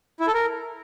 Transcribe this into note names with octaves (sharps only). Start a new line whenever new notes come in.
E4
A4
A#4